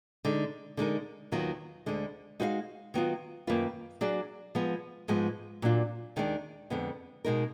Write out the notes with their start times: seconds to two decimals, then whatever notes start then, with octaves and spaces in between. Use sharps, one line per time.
0.25 D3 G#3 D#4
0.77 D3 G#3 D#4 A#4
1.32 D#2 D#3 F#3 B3 F4
1.86 D2 D3 G#3
2.40 G#3 D#4 F#4 B4 F5
2.94 D#3 F#3 B3 F4
3.47 F#2 D#3 A#3 F4 B4
4.01 F#3 D4 G#4 D5
4.55 F3 G#3 B3
5.08 G#2 F3 G#3 B3
5.62 A#2 F#3 D4 F4
6.16 D#2 D#3 G#3 D4
6.70 F2 D3 G#3 B3
7.25 B2 G#3 D#4 A#4